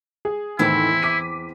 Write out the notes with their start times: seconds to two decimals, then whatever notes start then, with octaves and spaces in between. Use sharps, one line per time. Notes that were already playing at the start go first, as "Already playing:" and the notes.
0.25 G#4
0.59 E2 A2 D#3 E3 C4 E4
1.02 D6 B6 D#7